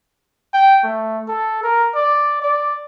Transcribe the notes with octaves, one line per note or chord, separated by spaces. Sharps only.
G5
A3
A4
A#4
D5
D5